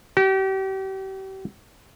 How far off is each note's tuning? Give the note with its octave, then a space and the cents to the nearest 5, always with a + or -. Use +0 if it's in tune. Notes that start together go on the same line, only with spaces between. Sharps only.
G4 -35